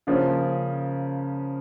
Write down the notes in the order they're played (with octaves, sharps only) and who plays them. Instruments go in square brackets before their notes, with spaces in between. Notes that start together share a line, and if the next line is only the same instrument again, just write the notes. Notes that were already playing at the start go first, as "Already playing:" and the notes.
[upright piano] C#3 F3 A#3 C#4